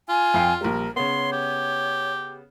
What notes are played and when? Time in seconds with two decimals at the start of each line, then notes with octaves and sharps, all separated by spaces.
0.09 F4 G#5
0.34 F2 F5 G5
0.61 A#1 G3 A#4
0.96 C#3 B3 C#5 C6
1.32 G4